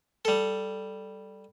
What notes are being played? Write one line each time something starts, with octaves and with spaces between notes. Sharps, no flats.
G3 A4